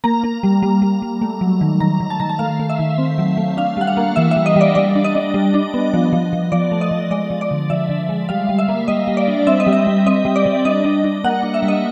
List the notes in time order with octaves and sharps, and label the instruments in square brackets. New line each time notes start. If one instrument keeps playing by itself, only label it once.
[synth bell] A#3 A#5
A#3
G3
G3
G3
G3
A3
F#3
D#3
D#3 A#5
D#3
A5
D#3 A#5
A5
A3 F5
A3
E5
D#3
C4
F#3
A3
D4 F5
G3 F#5
F5
A#3
E3 E5
E5
G3
D#5
G3 D5
G3 D5
D4
D#5
D4
G3
D4
B3
F3
F3
F3
F3 D5
A3
D#5
F3
G#3 D5
F3
D5
D3
F3 E5
D3
G#3
G3 F5
G3
E5
A#3
G3 D#5
G3
D5
D4
C4 E5
D#5
G3
E5
G3
C4 D#5
G3
D5
G3
D4 D#5
D4
D4
A#3 F#5
D4
E5
G3
D#5